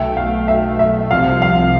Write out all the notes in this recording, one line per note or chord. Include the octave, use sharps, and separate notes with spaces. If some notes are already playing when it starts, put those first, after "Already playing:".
Already playing: B1 B2 A3 E5 G5
F5
E5
E5
C2 C3 F3 F5
F5